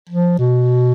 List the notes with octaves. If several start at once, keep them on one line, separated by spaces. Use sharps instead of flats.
F3
B2